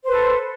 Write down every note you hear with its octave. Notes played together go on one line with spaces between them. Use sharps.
A4 B4 C5